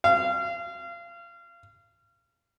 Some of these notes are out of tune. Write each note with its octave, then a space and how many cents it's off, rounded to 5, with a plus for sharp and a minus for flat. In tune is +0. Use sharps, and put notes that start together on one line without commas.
F5 -30